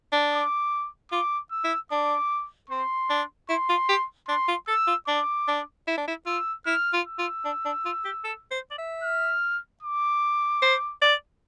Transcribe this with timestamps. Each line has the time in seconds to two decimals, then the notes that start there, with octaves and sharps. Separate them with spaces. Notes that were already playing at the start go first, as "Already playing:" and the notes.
0.12 D4
0.33 D6
1.12 F4 D6
1.51 E6
1.64 E4
1.91 D4 D6
2.69 C4 C6
3.10 D4
3.49 E4 C6
3.69 F4
3.89 G4
4.28 D4 C6
4.48 F4
4.68 A4 E6
4.87 F4
5.08 D4 D6
5.48 D4
5.87 E4
5.97 D4
6.07 E4
6.26 F4 E6
6.66 E4 F6
6.93 F4
7.06 E6
7.18 F4
7.45 D4
7.65 D4
7.85 F4
8.05 G4
8.24 A4
8.51 C5
8.71 D5
8.78 E5
9.03 F6
9.83 D6
10.62 C5
11.02 D5